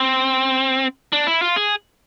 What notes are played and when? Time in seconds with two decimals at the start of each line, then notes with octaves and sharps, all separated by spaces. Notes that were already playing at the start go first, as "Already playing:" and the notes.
Already playing: C4
1.13 D4
1.27 E4
1.42 F4
1.56 G#4